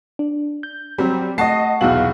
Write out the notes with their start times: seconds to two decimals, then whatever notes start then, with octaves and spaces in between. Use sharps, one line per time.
0.19 D4
0.63 G6
0.98 F#3 G3 C4
1.38 A3 D#5 F#5 A5 C#6 C7
1.81 F1 B1 E2 F#4 F5 F#7